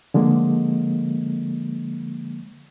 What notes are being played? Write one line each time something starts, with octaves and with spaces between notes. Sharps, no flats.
D3 F3 G#3 A#3